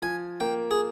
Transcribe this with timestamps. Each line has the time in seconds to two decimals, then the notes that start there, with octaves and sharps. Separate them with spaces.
0.02 F3 G#5
0.40 A#3 G5
0.71 G#4